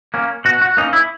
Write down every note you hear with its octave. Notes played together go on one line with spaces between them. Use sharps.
A#3 C#4
B2 F#4
F#4
A#3 C#4 D#4
E4